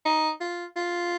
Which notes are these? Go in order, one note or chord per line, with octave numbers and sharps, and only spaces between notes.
D#4
F4
F4